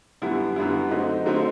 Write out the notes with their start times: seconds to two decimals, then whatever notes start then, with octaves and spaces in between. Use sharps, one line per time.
0.22 F#2 D3 G3 B3 E4
0.56 F#2 D3 G3 B3 E4
0.91 D3 F#3 A3 C4 D#4
1.26 D3 F#3 A3 C4 D#4